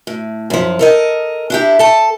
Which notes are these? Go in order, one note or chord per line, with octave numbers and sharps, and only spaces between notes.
A2
F#2 F3
A4 A#4 D#5
D4 E4 G4
A4 A5